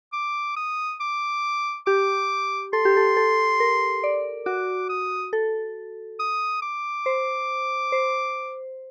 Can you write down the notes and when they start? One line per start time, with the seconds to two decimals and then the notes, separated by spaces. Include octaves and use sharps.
0.13 D6
0.57 D#6
1.01 D6
1.87 G4 D6
2.73 A4 C6
2.85 G4
2.97 A4
3.17 A4
3.60 A#4
4.03 D5
4.46 F#4 D6
4.90 D#6
5.33 A4
6.19 D#6
6.62 D6
7.06 C5
7.92 C5